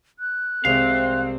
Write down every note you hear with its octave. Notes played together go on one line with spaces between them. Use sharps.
F#6
C2 G#3 C4 E5 F5